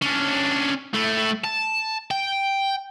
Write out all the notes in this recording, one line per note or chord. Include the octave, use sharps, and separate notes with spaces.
C#4 D4
A3 E4
A5
G5